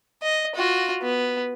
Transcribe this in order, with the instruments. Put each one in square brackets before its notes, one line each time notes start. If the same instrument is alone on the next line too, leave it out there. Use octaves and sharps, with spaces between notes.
[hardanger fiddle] D#5
F4 F#4
B3